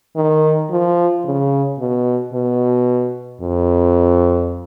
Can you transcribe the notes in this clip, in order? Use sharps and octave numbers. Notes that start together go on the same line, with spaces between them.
D#3
F3
C#3
B2
B2
F2